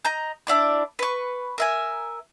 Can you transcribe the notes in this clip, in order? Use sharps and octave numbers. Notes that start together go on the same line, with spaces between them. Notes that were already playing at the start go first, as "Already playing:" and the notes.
D#5 A#5 G6
D4 E4 D5 D6
B4 C#6
A#4 E5 G#5